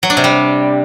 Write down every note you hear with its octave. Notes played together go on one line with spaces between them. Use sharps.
F#3
D4
C3
G3